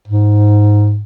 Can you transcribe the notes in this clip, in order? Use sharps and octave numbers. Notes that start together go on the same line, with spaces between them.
G#2